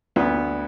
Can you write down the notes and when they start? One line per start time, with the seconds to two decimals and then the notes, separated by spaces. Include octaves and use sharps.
0.16 D2 B3